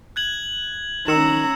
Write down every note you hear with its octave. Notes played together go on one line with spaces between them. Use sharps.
F#6 G#6 F#7
D#3 C#4 A#5 E6 C#7 E7